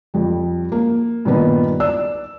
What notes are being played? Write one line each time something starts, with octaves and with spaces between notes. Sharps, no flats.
F2 G3
A#3
G2 A#2 D#3 B3
D5 E6